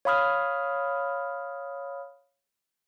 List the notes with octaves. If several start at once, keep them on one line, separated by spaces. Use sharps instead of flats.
C#5 F5 B5 D#6 F6